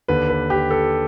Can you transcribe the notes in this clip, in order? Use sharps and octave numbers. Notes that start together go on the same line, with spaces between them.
D#2 D3 B4
B4
G4
A4